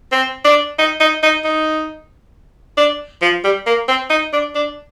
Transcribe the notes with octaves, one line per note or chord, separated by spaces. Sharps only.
C4
D4
D#4
D#4
D#4
D#4
D4
F3
G3
A#3
C4
D#4
D4
D4